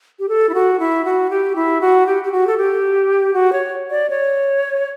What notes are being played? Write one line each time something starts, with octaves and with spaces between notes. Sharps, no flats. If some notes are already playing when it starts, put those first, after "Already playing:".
G4
A4
E4
F#4
E4
F#4
G4
E4
F#4
G4
G4
F#4
A4
G4
F#4
C#5
D5
C#5